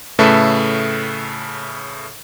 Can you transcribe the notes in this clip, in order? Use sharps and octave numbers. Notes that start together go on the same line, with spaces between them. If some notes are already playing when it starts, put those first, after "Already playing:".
A2 C#3 A3 A4 B4 E5